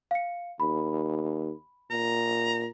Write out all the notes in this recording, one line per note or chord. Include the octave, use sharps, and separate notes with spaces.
F5 C#7
D#2 B5
A#2 A#5